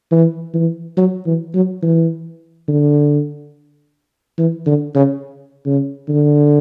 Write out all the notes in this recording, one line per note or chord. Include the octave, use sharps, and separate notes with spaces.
E3
E3
F#3
E3
F#3
E3
D3
E3
D3
C#3
C#3
D3